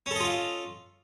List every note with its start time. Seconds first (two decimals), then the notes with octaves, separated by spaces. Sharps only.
0.06 C#4
0.11 A4
0.15 D#5
0.20 F4
0.25 F5